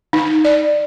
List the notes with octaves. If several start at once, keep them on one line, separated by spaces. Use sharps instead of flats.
D#4
D5